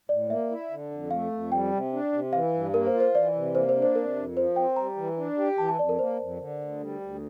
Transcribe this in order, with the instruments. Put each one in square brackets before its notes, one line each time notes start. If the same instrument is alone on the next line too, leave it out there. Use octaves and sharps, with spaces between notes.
[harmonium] A2 [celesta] D5
[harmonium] A#3 [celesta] E5
[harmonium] E4
D3
F2
[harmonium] A3 [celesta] F5
[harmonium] F2
[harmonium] G3 [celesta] G5
[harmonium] C3
D4
C3
[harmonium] E3 [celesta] F5
[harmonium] G2
[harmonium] A#3 [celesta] A#4
[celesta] C5
[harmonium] F4
[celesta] C5
[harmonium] E3 [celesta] D5
[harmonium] C3
[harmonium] A#3 [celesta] C5
[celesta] C5
[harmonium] D4
[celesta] C5
[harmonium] C3 [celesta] A#4
[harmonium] F2
[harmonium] F3 [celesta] C5
[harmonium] C4 [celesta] G5
[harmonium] G3 [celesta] A#5
[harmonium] E3
D4
G4
[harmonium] E3 [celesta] A5
[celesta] A5
[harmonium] F2 [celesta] D5
[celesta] A#4
[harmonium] A#3 [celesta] C5
[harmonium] F2
D3
D2
G3
D2